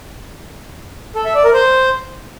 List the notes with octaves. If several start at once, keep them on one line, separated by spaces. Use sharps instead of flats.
A4
E5
D5
A#4
C5